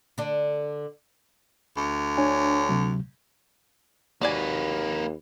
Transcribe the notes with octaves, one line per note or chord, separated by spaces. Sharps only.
D3 D4
D2
D4 C#5 G#5
C3 F#3
D#2 A#3 F#4 B4 D5 G#5